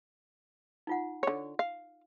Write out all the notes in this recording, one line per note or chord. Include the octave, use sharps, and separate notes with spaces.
D#4 F4 F#5
D3 C#5
F5